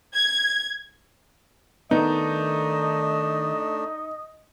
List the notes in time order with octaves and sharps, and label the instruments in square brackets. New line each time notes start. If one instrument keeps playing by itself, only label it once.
[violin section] G#6
[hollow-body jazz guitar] D#3 B3 [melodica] A3 D4 [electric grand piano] D#4 [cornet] D#5